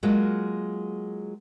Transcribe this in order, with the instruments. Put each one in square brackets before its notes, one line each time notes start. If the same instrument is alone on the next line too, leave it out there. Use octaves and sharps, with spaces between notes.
[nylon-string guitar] F#3 G#3 A#3 F4 F#4